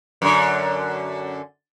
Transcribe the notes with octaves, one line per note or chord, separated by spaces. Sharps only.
F#2 D3